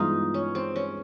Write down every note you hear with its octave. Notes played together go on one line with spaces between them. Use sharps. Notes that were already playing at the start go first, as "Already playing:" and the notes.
Already playing: G2 E3 G#3 B3 D#4 F4
C#4
C4
C#4